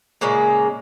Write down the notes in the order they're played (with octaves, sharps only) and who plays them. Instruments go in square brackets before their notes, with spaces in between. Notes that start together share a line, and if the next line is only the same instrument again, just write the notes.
[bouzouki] A#2 C#3 G#3 A#3